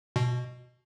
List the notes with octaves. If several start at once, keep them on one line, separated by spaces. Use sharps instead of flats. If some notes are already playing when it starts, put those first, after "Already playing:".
B2